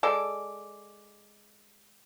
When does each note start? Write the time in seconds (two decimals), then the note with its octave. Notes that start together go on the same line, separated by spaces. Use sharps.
0.03 G#3 A4 D5